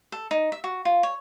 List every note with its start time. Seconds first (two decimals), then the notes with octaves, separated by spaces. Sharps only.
0.12 A4
0.31 D#4
0.52 E5
0.64 F#4
0.85 F4
1.03 C#5